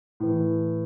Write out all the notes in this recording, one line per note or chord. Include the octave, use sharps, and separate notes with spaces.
A2 E3